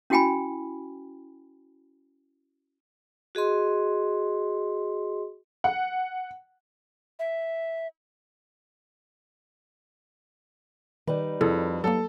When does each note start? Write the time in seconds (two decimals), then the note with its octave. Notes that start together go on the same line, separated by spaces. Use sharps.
0.10 C#4 E4 F#4 G5 G#5 B5
3.35 F#4 G#4 D#5 C6
5.64 F#5
7.19 E5
11.08 D#3 G3 D#4 B4
11.41 F2 E4 G#4 A4
11.84 F#3 A#3 A4